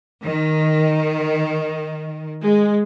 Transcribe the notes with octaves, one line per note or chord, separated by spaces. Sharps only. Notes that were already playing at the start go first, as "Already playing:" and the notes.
D#3
G#3